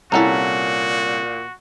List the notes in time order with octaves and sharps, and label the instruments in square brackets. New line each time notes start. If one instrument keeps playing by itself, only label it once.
[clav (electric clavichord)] C2 C#4 A4 [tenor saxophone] A#2 [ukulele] E4 F#5 A#5 [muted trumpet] F#4